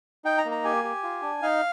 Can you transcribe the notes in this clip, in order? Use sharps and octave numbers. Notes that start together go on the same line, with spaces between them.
D#4 G5
A#5
A#3
A#5
G4 G#5
G4
F4
D4
D#4 F5